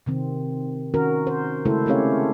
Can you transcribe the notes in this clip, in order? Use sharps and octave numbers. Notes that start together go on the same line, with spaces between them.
C3 D#3 C4
D#3 C#4 F#4 A#4
C5
C#3 G#3 A3 E4 A4 C5
A3 C4 C#4 G4 C#5 F5